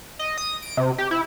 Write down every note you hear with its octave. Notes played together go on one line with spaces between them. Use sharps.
D#5
D#6
D7
C3
G4
E4